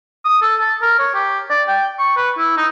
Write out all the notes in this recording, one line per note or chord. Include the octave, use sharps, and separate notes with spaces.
D#6
A4
A5
A#4
C#5
G4
D5
G5
C#6
B4
E4
D#4